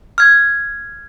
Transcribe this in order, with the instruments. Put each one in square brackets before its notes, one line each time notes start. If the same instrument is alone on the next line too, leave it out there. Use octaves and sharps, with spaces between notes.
[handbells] F6 G#6